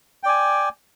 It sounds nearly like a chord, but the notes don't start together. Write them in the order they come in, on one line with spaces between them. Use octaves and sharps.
G5 D5 G#5